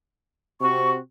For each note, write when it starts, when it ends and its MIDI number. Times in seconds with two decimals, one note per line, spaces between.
0.61 0.99 48
0.61 0.99 60
0.61 0.99 66
0.61 0.90 85